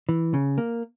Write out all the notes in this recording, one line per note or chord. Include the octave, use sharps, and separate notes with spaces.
E3
C#3
A#3